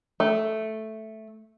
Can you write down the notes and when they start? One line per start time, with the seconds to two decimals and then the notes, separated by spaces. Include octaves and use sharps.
0.20 A3